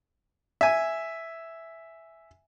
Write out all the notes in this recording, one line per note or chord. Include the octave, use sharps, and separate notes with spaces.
E5 G#5